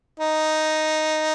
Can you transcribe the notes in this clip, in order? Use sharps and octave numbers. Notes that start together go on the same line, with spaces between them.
D#4